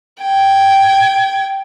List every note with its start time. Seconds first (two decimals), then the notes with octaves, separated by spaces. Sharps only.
0.22 G5 G#6